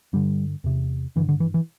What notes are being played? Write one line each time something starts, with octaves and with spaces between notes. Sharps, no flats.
G2 D3 G3
E2 C3
G2 D3 E3
D3
E3
E3